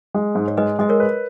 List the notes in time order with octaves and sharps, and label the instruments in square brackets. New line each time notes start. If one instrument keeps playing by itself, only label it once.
[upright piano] G#3
G#2
[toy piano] C#5
[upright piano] G#3 [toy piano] B4 D#5
[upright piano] G#3 [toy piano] D#5
[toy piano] A#4 C#5
[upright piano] B4